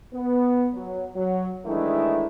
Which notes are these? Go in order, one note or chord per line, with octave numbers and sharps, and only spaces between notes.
B3
F#3
F#3
D#3 E3 G#3 A3 D4 E4